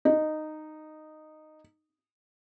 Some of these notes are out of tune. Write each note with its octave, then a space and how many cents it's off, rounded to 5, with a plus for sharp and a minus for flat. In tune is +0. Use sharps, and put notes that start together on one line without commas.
D#4 -10